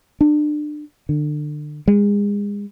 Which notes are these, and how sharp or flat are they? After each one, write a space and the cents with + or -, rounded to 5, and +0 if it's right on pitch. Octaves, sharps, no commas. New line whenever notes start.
D4 +30
D3 +30
G#3 -30